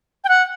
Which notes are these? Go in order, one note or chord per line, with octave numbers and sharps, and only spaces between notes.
G5
F#5